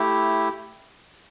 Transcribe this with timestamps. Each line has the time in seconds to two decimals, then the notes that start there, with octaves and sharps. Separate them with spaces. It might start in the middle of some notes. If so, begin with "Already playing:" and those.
Already playing: A3 E4 G4